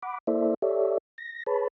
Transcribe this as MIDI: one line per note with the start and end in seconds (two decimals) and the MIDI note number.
0.03 0.18 78
0.03 0.18 83
0.03 0.18 86
0.27 0.54 58
0.27 0.54 64
0.27 0.54 69
0.27 0.54 72
0.27 0.54 74
0.27 0.54 76
0.62 0.98 67
0.62 0.98 69
0.62 0.98 73
0.62 0.98 74
0.62 0.98 76
1.18 1.43 94
1.47 1.68 68
1.47 1.68 71
1.47 1.68 73
1.47 1.68 81
1.47 1.68 83